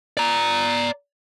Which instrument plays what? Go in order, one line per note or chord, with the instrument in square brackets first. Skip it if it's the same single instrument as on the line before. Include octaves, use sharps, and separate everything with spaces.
[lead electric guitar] D5 A#5